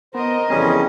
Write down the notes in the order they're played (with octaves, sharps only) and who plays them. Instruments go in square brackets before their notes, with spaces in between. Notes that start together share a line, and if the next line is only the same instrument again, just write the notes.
[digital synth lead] B3 [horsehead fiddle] A#4 D#5 [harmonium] C5
[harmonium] F2 C#3 E3 [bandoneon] G3 C#4 [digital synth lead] G#4